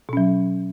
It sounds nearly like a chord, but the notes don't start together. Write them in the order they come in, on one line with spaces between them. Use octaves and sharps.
B2 C#4 F#3